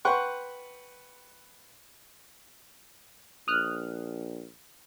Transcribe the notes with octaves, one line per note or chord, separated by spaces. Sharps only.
B4 F#5 G5 C6 C#6
A#1 D#6 F6 F#6